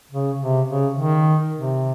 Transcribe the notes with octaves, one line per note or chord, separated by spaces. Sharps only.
C#3
C3
C#3
D#3
C3